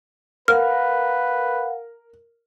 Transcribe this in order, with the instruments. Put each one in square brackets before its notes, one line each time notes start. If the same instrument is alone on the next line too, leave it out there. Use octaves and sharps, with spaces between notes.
[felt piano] A#4 [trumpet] B4 [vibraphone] F5 F#5 [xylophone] F6